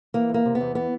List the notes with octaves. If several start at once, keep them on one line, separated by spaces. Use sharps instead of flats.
E3 A#3
E2
A#3
C3
B3
E2
E3 B3